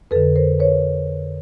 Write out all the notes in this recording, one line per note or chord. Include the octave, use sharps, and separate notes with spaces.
F2 D3 A4 B4
A#4 C5
B4 C#5